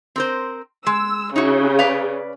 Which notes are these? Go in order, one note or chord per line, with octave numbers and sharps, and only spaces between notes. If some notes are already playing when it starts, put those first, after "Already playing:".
C4 A#4 C5
G#3 E6
C#3 D#4 E4 F#4
B4 D5 F5